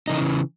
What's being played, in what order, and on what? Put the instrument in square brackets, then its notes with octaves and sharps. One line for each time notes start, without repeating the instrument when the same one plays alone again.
[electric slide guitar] C#3 E3 D#4